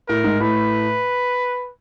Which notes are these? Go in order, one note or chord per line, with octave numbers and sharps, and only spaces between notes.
A2 A#4
G#2
A2 B4